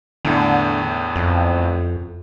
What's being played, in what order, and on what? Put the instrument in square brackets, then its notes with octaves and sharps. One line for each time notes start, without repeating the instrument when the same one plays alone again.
[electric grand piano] E2 A2 [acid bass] D3
[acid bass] F2